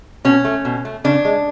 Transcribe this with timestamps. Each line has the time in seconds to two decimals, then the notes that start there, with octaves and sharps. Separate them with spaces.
0.25 B2 C#4
0.44 A3
0.65 B2
0.85 A3
1.04 C#3 D4
1.25 G#3